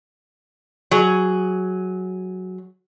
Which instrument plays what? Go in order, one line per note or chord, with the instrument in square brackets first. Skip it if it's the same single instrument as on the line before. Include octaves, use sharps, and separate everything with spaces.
[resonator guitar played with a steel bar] F#3 G#4